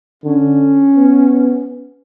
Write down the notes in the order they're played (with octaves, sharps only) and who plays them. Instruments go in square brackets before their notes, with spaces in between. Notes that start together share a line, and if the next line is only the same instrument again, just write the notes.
[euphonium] D3 [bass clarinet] C#4
[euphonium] B3